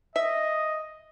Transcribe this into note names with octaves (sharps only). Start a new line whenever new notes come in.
D#5 E5